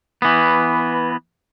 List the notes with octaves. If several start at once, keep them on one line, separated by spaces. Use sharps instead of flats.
E3 B3